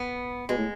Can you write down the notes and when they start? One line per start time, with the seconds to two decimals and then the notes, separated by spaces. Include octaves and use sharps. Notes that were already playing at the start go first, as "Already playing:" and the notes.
Already playing: B3
0.49 B2 G#3
0.58 A2